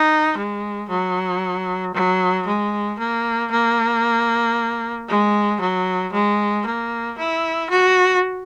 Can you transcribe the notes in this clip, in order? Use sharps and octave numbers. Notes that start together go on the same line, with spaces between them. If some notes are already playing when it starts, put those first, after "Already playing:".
Already playing: D#4
G#3
F#3
F#3
G#3
A#3
A#3
G#3
F#3
G#3
A#3
E4
F#4